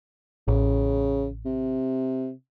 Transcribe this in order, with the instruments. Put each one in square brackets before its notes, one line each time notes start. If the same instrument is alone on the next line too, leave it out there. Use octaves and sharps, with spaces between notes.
[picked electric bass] A1 [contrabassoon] C#3
[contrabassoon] C3